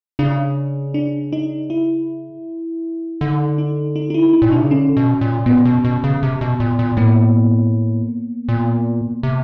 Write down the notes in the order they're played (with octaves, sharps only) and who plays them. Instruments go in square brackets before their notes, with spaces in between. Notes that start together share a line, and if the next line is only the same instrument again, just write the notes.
[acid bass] C#3 [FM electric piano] D4
[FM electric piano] D4
D#4
E4
[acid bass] D3 [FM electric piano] D#4
[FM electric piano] D#4
D#4
D#4
E4
D#4
[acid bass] A#2
B2
[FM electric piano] D4
[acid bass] C3
C#3
[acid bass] D3 [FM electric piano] C#4
[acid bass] B2
A#2
[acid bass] A#2 [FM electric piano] B3
[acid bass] B2
B2
C#3
C3
B2
A#2
A#2
[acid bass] A2 [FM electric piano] A#3
[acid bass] A#2
C3